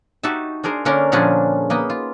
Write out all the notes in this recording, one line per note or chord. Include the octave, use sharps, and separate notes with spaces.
D#4 F#4 G4 E5 A5
D4 G#4 A#4 C5
D3 A#3 C#4 D4 A#4
A#2 D3 F3 C#4 D4 G#4
A#3 B3 D#5
F4